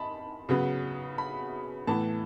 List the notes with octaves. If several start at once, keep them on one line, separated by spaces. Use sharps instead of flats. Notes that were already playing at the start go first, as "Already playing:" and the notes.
Already playing: D#3 A5 B5
C#3 F#3 B3
B5
A2 E3 B3 A5